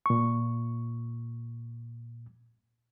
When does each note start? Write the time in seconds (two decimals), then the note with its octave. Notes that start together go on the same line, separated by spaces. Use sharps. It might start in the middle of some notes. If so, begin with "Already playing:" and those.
0.06 A#2 C#6